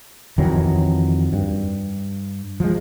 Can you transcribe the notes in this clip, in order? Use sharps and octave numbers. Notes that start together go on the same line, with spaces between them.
F2 D#3 E3 F#3
G2
F3 G#3